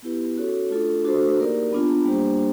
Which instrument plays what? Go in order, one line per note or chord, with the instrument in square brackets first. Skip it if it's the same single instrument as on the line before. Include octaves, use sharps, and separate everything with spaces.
[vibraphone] B3 E4 G4 B4
C#4 F#4 A4 C#5
A3 D4 F4 A4
A3 D4 F#4 A4 C5
A#3 D#4 G4 A#4 D5
F#3 B3 D4 F4
G3 A#3 D4 G4 C5